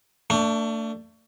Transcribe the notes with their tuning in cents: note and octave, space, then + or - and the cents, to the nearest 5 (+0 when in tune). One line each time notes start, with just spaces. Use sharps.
A3 +35 D4 +0